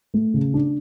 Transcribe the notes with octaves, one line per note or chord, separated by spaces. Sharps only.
A3
C#3
D4